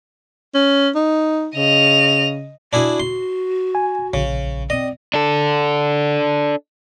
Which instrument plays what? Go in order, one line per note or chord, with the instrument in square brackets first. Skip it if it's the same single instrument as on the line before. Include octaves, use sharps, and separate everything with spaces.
[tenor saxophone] C#4
D#4
[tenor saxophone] C#3 [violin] D#5 F7
[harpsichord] D4 E4 G#4 [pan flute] F#4
[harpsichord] C6
[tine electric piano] G#5
[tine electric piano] A#1 [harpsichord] C#3
[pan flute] C4 [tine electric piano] D5 [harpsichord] D#5
[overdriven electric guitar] D4 A4